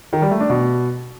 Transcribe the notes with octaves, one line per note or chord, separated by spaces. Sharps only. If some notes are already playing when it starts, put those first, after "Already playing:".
D#3
G3
A3
D4
B2